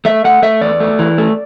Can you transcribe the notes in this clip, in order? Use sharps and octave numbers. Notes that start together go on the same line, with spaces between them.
A3 E5
A3 F#5
A3 E5
E2 D5
A3
E3
A3